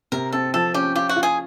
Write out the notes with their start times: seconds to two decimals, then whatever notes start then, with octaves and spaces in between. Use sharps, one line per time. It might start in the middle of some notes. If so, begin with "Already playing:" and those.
0.12 C3 A#4
0.32 C4 A4
0.54 F3 A4
0.74 C#4 G4
0.95 F4 G4
1.09 F#4
1.16 F4
1.23 G#4